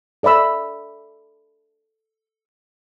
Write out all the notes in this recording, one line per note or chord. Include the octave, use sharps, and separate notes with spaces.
A4 D5 E5 B5 E6